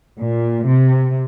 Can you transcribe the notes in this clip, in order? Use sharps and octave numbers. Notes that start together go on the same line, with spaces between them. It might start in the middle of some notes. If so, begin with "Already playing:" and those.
A#2
C3